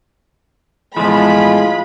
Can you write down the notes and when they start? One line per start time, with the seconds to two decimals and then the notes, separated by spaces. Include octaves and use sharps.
0.97 E2 A2 F3 G#3 F4 B5